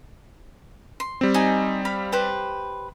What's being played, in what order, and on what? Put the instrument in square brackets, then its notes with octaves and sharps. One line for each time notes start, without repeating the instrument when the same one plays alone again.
[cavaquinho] C6
[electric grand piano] G3 C4
[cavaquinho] D#4 D#5 G#5
F5 B5
G4 B4 C5